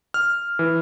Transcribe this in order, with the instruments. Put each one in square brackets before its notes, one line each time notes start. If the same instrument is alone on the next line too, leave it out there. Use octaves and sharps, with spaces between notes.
[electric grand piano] F6
E3